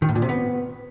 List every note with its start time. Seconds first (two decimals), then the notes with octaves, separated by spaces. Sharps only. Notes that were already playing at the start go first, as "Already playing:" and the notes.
0.02 D#3
0.09 A2
0.15 A#2
0.22 C3
0.29 B3